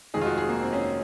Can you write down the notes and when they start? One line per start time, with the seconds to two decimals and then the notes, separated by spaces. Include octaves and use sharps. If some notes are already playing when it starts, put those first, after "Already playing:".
0.14 F1 F2 D#3 G#3 G#4
0.21 F4
0.26 F#4
0.37 G#4
0.49 A#3
0.61 C4
0.73 C#4